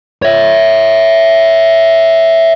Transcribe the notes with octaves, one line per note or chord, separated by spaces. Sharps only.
C#5 E5